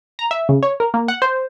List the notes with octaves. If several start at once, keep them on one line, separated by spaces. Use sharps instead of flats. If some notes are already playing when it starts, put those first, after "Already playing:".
A#5
E5
C#3
C#5
A#4
A#3
F#5
C5